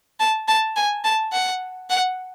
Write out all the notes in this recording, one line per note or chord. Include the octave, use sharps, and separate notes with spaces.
A5
A5
G#5
A5
F#5
F#5